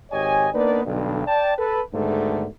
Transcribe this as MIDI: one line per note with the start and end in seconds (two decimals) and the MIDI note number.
0.11 0.48 32
0.11 0.48 67
0.11 0.48 73
0.11 0.48 75
0.11 0.48 80
0.54 0.83 58
0.54 0.83 59
0.54 0.83 62
0.54 0.83 63
0.54 0.83 71
0.54 0.83 74
0.85 1.27 35
0.85 1.27 43
0.85 1.27 50
1.27 1.54 74
1.27 1.54 79
1.27 1.54 81
1.58 1.81 69
1.58 1.81 71
1.94 2.46 44
1.94 2.46 47
1.94 2.46 50
1.94 2.46 51
1.94 2.46 57